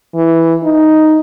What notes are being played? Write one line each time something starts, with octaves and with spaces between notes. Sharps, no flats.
E3
D#4